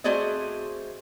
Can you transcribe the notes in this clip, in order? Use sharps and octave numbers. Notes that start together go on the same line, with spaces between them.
A3 C4 F#4 G#4 D5 D#5